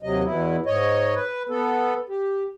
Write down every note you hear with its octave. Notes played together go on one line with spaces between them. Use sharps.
D#2 C3 F#3 D#5
E2 B2 E4
G#2 C#5 D#5
B4
B3 A4
G4